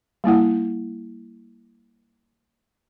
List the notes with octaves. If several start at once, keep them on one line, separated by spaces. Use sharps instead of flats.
G3 A#3 E4 F#5